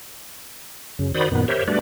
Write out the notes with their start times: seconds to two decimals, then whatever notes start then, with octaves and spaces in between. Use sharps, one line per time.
0.99 F#2 C#3
1.14 D#3 F#4 C5 D5 B5 D#6
1.32 F#2 A#2 D#3 B3
1.48 G4 A#4 C5 C#5 E5
1.68 G3 A3 D4 F#4 B4 D5